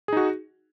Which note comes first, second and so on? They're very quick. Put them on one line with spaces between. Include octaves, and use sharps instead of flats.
G#4 D#4 F#4